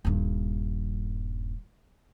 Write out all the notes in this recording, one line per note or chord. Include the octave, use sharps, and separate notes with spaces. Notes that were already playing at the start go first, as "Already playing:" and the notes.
D#1 G2